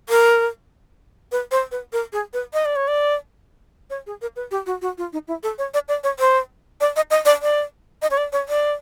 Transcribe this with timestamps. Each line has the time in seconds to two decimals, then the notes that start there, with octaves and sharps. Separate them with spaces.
0.09 A#4
1.32 B4
1.51 C5
1.72 B4
1.93 A#4
2.13 G#4
2.33 B4
2.53 D#5
2.65 D5
2.76 C#5
2.88 D5
3.90 C#5
4.07 G#4
4.22 A#4
4.36 B4
4.51 G4
4.66 F#4
4.82 F#4
4.98 F4
5.13 D#4
5.28 E4
5.43 A4
5.58 C#5
5.74 D5
5.88 D5
6.04 C#5
6.19 C5
6.81 D5
6.96 D#5
7.11 D#5
7.26 D5
7.42 D5
8.02 D#5
8.11 C#5
8.17 D5
8.32 C#5
8.49 D5